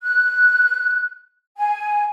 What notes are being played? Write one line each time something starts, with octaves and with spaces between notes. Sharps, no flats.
F#6
G#5